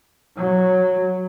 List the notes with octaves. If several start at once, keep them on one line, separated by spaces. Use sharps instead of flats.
F#3